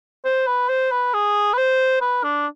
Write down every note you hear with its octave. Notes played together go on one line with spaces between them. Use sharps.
C5
B4
C5
B4
G#4
B4
C5
B4
D4